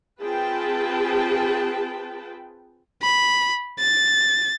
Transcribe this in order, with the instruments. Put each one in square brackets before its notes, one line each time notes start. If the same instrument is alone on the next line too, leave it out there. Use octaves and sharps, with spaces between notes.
[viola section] C4 F4 G#4 B4 G5 A5
[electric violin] B5
A6